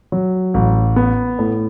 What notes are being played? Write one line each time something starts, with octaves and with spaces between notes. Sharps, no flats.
F#3
A1
B3
A2